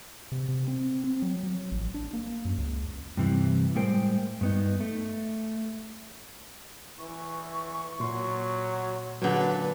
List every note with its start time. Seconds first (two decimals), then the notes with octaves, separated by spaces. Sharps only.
0.32 C3
0.48 C3
0.68 C4
1.04 C4
1.22 F#3
1.43 F#3
1.71 A1
1.94 D4
2.13 A#3
2.45 F#2
2.58 C#2
3.17 G2 C3 E3
3.76 A2 G3 G#3 A#4 C5 G5
4.41 G2 B3 D#4
4.80 A3
6.99 E3 C#6
8.00 A#2 F#3 C6
9.22 D#2 A#2 D3 F#3 B4